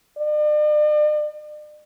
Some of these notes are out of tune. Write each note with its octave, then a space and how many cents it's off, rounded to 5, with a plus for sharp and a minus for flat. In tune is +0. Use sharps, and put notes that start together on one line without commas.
D5 +45